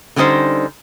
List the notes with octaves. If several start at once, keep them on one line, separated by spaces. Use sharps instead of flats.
D3 G3 C#4 D#4 C5